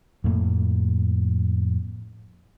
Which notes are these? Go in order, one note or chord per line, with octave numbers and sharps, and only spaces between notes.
F2 A2 A#3